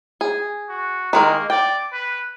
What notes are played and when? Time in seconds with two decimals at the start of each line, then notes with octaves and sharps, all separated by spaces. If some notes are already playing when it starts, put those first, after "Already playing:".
0.21 G#4
0.69 F#4
1.13 D#3 G#3 A#3 A#4
1.50 D5 G5
1.93 B4